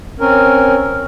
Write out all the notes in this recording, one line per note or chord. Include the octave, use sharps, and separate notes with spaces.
C4 C#4 A#4